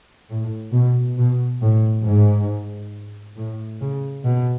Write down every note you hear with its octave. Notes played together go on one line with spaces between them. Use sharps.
A2
B2
B2
A2
G#2
A2
C#3
B2